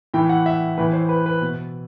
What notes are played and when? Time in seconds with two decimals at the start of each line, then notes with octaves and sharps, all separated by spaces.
0.14 A2 E3 G5
0.29 F#5
0.46 E5
0.78 A2 E3 B4
0.93 C5
1.09 B4
1.26 B4
1.41 B2